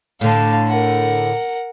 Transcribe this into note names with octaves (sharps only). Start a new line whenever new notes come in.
A2 D3 F5 A5
A#4 F#5